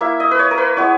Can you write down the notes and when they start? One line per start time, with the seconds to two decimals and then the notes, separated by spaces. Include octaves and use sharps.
0.01 A#3 E4 E5
0.20 D#5
0.31 B4
0.39 C#5
0.51 A#4
0.58 B4
0.77 G#3 B3 E4 C#5